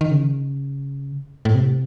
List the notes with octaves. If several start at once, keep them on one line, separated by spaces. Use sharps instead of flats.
D#3
C#3
A2
C3